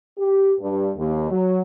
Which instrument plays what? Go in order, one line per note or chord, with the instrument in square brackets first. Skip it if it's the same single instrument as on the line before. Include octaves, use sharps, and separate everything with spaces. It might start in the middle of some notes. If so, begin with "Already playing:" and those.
[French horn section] G4
G2
D#2
F#3